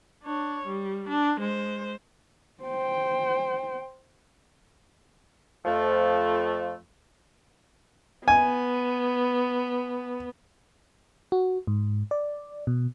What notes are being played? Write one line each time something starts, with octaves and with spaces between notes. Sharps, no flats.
D4 C#5
G3
D4
G#3 C5
C5 G5
F2 F3 A3
B3 G#5
F#4
G#2
D5
B2